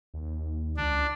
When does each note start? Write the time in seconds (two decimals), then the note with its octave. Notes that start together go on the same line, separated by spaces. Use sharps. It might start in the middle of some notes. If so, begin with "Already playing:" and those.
0.14 D#2
0.77 C#2 D4